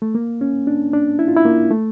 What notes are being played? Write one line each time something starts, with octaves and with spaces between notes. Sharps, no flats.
A3
A#3
C#4
D4
D4
E4
F4
E4
A#3
A3